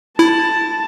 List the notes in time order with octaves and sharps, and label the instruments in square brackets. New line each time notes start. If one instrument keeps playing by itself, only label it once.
[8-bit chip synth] E4 [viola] A5